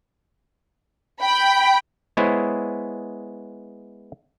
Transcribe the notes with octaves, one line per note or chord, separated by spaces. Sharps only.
G5 B5
G#3 B3 E4 G#4 C5 C#5